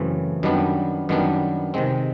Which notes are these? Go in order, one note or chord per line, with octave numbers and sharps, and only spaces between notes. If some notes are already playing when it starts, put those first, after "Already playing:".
Already playing: F#2 C#3 E3 A3 C4
F#2 D#3 G3 B3 D4
F#2 D#3 G3 B3 D4
C3 D#3 G#3 C4